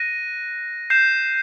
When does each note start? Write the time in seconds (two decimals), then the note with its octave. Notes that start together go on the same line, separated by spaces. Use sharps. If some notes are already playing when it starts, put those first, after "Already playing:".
Already playing: F#6 A#6 D#7
0.90 G6 C7 E7